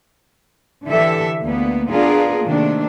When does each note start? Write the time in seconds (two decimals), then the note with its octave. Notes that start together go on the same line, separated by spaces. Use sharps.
0.86 D3 E3 G4 A4 E5
1.42 D2 A#3 B3
1.89 B3 D4 F4 G#4 A#4
2.46 C3 D#3 A3 A#3 D4